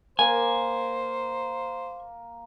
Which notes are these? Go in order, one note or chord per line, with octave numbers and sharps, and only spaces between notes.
A#3 C5 G#5